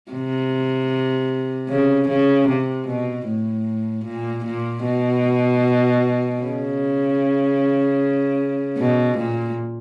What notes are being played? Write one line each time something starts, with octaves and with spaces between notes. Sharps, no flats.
C3
C#3
C#3
C3
B2
A2
A#2
A#2
B2
C#3
B2
A#2